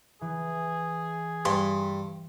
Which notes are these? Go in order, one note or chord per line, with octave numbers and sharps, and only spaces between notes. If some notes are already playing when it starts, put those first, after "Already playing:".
E3 G#4
G2 C6